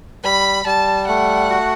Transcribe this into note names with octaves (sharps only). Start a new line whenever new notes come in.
G3 B5
G3 A5
A3 F#5
F#4